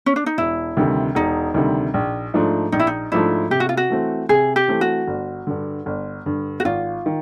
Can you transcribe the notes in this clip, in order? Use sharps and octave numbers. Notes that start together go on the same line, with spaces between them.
C#4
D4
D#4
E1 E4
D2 C3 D#3 G3
E1 D#4
D2 C3 D#3 G3
A#1
G#2 F3 A3 D4
A#1 D#4
E4
D#4
G#2 F3 A3 D4 E4
C3 G4
F#4
F4
F#4
E3 A3 C4
C3 G#4
G4
E3 A3 C4
F#4
G1
G2 D3
G1
G2 D3
F#4
G#1 F4
D#3